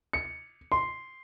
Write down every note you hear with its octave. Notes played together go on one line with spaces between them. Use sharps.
C#7
C6